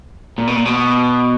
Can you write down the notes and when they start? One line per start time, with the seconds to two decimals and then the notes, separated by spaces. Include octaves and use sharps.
0.38 A#2
0.47 B2
0.56 A#2
0.65 B2